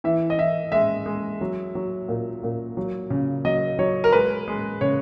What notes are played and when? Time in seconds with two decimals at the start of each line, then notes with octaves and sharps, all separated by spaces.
0.04 E3 E5
0.30 D#5
0.38 E3 E5
0.72 G#3 E5
1.06 G#3
1.41 F#3
1.75 F#3
2.08 A#2
2.43 A#2
2.77 F#3
3.10 C#3
3.45 F#3 D#5
3.79 F#3 C#5
4.04 A#4
4.12 G#3 B4
4.48 G#3
4.81 C#3 C#5